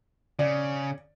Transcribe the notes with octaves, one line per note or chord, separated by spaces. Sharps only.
C#3 D5